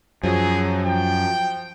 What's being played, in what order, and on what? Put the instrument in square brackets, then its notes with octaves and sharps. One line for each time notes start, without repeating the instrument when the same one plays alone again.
[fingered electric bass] F#2 [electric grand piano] F3 F#3 [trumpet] G#4
[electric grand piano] F3 [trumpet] G5